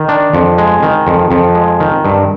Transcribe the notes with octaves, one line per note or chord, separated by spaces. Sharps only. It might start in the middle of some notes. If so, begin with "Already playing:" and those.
Already playing: D#3
D4
F2
G#3
D#3
F2
F2
G#3
D#3
G2